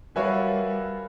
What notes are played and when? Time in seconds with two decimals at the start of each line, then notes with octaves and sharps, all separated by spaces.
0.16 G3 F#4 A#4 B4 C#5 E5 F5 G#5